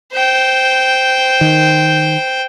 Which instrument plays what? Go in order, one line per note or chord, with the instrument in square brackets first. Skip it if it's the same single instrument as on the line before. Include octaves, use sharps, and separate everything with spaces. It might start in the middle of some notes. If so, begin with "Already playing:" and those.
[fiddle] C5 G5
[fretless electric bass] D#3